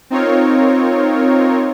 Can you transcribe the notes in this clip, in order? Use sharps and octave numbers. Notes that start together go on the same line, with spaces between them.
C4 D#4 F4 A#4 C#5